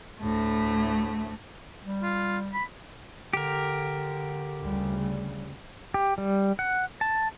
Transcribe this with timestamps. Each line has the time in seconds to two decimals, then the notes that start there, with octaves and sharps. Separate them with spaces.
0.19 D2 A2 A3
1.84 G3
2.03 F4
2.54 B5
3.33 D3 G4 A#4
4.63 D2 C#3 G3
5.94 G4
6.18 G3
6.59 F#5
7.01 A5